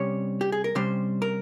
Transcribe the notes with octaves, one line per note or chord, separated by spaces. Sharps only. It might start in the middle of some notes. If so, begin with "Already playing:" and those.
Already playing: C3 G3 C#4 C#5
G4
G#4
A#4
C3 G3 C#4 C5
A#4